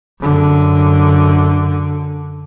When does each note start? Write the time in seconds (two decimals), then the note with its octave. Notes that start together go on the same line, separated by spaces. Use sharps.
0.19 F#2 D3